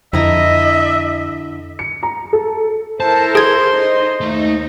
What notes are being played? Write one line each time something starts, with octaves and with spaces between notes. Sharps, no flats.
F2 D3 E4 D#5 E5 A#5
C#7
A#5
A4
E4 A4 A#4 C5 A5
G#4 C6 G#6
D#4
D#2 A3 D#4